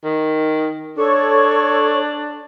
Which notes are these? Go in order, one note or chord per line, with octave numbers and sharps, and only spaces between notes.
D#3
D4 A4 C#5 C#6